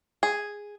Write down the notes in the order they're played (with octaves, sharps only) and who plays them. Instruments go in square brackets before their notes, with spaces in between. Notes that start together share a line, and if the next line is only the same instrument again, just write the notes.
[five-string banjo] G#4